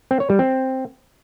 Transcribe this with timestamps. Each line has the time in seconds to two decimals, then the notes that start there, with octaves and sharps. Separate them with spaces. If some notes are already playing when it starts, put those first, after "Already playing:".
0.11 C4
0.20 C#5
0.30 G3
0.39 C4